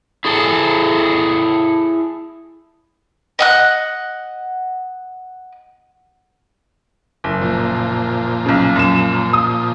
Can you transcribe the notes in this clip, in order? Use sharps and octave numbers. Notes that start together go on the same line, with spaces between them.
E4 G#4 A4
D#5 F#5 F#6
F#1
A#2 F3
B1 C#3
F#2 E7
D#6